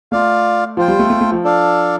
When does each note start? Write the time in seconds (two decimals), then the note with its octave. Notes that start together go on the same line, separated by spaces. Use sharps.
0.12 A3 F4 D5 F5
0.77 F3 F4 C5 G5
0.88 G3
0.99 A3
1.10 A3
1.21 A3
1.32 F3
1.44 D4 A4 D5 F5